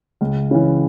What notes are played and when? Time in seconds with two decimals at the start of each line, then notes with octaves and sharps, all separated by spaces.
0.21 C#2
0.51 C#3 E3